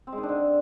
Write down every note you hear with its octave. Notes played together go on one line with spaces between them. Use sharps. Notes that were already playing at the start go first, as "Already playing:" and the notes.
C4
G#3
D#3
D4
D3